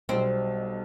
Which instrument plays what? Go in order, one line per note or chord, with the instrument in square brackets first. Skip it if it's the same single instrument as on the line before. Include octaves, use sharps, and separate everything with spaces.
[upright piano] B1 B2 G3 [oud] C4